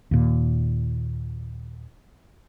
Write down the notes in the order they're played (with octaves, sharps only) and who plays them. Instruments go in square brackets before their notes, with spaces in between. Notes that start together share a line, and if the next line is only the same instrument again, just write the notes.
[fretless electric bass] D#2 A#2